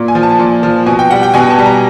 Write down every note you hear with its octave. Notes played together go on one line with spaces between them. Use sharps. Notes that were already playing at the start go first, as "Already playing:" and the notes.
Already playing: A#2
G#5
F3
A5
A#2
F3
B2 G#5
G5
G3 F#5
G5
B2 G#5
A5
G3
A#5